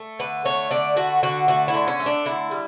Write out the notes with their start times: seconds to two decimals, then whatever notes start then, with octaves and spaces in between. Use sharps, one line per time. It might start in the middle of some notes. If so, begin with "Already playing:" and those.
Already playing: A3
0.19 D3 B4
0.45 A3 C#5
0.70 D3 D5
0.96 A3 F#4
1.23 D3 F#4
1.48 A3 F#4
1.68 E4
1.74 D3
1.87 C#4
2.00 A3
2.06 D4
2.25 D3 E4
2.51 G3